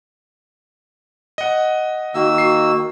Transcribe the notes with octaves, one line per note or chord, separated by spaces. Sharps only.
D#5 F#5
D#3 A#3 F#4 E6
F#4 C7